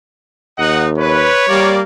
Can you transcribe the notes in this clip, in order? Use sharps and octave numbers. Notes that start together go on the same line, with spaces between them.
D#2 D#4 D#5 F#5
B4 C#5
G3 A#3 D5